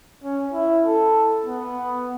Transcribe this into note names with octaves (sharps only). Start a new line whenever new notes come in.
C#4
E4
A4
B3